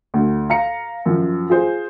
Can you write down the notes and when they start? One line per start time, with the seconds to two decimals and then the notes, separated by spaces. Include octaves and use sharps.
0.14 D2
0.50 F5 A#5 C#7
1.06 F#2 F3
1.50 F4 G#4 C5